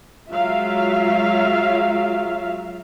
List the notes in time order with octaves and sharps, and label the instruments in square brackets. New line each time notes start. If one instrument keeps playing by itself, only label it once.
[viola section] F#3 G#3 F4 E5 F5